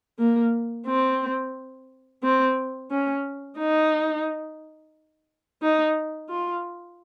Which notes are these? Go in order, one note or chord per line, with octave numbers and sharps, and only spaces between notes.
A#3
C4
C4
C#4
D#4
D#4
F4